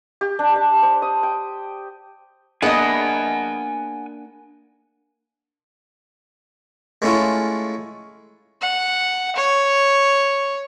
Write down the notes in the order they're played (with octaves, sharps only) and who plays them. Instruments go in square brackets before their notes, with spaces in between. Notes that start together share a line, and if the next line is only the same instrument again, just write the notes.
[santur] G4
D4
A5
C5
D#6
G5
[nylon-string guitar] A#3 D4 G#4 [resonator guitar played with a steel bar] B3 D#5 [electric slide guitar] F#5 G#5
[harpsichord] G#3 A3 C#4 E4 F4
[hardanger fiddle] F#5
C#5